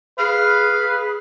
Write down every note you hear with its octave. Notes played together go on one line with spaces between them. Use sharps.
G#4 B4 F5